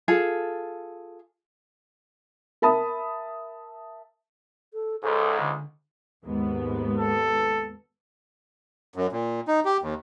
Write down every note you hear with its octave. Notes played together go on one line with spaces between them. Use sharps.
F4 G#4 A4
A#4 E5 A5 B5 D#6
A4
C#2 G#2 A4
D3
D#2 G#2 B3
A4
F#2
A#2
D#4
G4
D#2